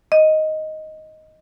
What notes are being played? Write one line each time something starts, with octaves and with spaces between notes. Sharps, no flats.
D#5